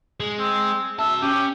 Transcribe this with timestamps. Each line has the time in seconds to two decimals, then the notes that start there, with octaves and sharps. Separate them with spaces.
0.20 G#3
0.39 C4
0.99 F#4 E5 A5
1.22 C#4 G4